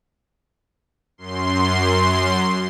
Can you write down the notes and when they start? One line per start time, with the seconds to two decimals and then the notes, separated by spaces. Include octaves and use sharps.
1.18 F#2 C6